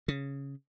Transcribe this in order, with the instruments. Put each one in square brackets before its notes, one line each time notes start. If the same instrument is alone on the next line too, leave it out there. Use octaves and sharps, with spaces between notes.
[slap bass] C#3